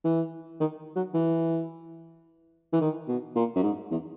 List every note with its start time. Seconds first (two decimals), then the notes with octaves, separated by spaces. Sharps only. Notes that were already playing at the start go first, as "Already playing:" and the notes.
0.05 E3
0.60 D#3
0.96 F#3
1.14 E3
2.73 E3
2.81 D#3
3.08 B2
3.36 A#2
3.56 F#2
3.63 G#2
3.91 E2